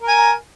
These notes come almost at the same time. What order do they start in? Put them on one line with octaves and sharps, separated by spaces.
A#4 A#5 G#5